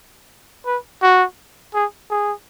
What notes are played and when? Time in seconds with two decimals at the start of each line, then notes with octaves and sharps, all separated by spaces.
0.66 B4
1.02 F#4
1.74 G#4
2.11 G#4